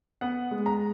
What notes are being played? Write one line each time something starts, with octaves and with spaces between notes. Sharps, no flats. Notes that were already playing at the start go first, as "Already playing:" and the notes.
B3 F#5
G#3
A#5